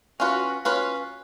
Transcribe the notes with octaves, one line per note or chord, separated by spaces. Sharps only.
C#4 F4 F#4 B4
C#4 F4 B4